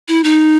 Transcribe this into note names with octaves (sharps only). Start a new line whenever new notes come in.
E4
D#4